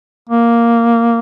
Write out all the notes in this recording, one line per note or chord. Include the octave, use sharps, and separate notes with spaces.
A#3